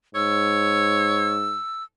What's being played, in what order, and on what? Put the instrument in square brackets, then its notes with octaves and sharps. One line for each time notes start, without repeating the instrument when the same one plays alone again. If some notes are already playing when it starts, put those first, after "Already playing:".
[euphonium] G#2 [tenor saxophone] C#5 [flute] E6